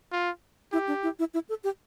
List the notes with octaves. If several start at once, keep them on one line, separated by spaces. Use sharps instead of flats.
F4
E4 G4
D4
E4
E4
E4
A4
G4